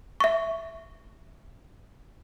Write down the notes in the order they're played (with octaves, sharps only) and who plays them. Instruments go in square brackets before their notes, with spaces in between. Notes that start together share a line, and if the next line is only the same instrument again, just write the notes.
[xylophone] E5 C#6